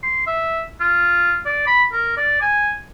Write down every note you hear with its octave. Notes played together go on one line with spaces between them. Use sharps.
C6
E5
F4
D5
B5
A#4
D5
G#5